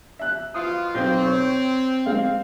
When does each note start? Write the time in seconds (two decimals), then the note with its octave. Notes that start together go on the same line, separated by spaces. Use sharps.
0.19 E5 F#6
0.54 B2 F3 F4 D#6
0.95 B1 C4 G6
1.25 C#5
2.06 G#3 F5